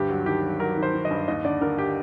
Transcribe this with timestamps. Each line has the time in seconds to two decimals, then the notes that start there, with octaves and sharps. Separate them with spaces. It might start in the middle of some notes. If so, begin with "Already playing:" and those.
Already playing: D2 G2 G4
0.10 F#3
0.26 D#3 G4
0.43 F#3
0.60 F#3 A#4
0.77 D#3
0.83 C5
0.94 D#3
1.05 D#5
1.11 G2
1.28 D#2 D#5
1.45 D3 D5
1.61 D3 A#4
1.78 G4